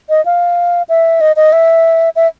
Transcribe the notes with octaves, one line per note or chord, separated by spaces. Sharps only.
D#5
F5
E5
D#5
D#5
E5
E5